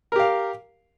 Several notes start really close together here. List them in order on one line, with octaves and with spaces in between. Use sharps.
A#4 G4 F5